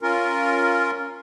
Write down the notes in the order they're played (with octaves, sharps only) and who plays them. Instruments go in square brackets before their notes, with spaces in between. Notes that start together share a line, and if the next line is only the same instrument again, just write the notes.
[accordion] C#4 F4 A#4